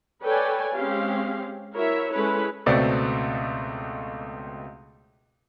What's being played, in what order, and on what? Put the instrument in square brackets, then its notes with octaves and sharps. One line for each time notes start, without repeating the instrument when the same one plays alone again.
[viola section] A4 B4 C#5 D5 G5 G#5
G#3 C4 C#4 G4 F5
E4 F#4 A#4 C#5 E5
G#3 C#4 E4 A4 B4 C#5
[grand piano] C#2 B2 A3 C4 D5